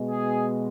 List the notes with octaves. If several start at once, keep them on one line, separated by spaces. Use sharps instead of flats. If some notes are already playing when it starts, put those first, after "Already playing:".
Already playing: B2 G#3
G#4